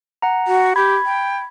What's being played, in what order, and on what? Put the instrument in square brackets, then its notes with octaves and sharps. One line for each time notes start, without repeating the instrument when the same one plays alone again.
[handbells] F#5 A#5
[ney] F#4
[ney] G4 [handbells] B5 G#6
[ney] G5